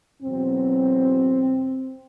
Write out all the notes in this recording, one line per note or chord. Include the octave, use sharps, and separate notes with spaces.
E2 B2 F#3 C4